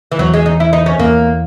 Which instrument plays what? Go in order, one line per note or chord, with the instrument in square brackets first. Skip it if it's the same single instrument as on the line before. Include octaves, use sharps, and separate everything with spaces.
[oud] E3
[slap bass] E2 [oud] F#3
[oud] G#3
D#4
E4
D#4
C#4
[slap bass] E2 [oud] A#3